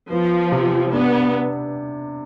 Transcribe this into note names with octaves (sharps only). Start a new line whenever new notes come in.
F3 B3
C3
B3 D4